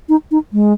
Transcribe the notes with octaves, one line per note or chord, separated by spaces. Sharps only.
D#4
D#4
G#3